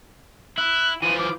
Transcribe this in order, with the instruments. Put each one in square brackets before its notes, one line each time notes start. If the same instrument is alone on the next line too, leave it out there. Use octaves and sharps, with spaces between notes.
[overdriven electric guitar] E4 [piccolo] F#6
[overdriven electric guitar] E3 F3 [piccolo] D#7
[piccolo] D6